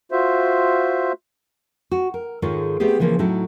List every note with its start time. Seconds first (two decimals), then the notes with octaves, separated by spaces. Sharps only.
0.12 F4 F#4 C5 E5
1.91 F#4
2.14 A#4
2.42 G#2 D#3 G#3 F4 A4 C#5
2.80 A3 B3 C4 G4 G#4
2.99 C#3 E3 F3 A#3 C4 C#4
3.19 A2 F#3 D#4 E4 A4